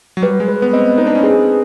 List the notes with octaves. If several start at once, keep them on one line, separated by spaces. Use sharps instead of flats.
F#3
G3 B4
G#3
B4
B3
C4 D#5
D#4 B4
D4
C#4
C4 G#4